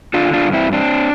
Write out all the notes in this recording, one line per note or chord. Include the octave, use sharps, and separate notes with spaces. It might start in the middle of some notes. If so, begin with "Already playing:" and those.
D3 D4 F4
D4 F4
G2
C4 E4
C4 D4